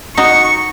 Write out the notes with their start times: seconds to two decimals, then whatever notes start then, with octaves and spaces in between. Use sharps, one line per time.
0.17 D#4 F#4 C#6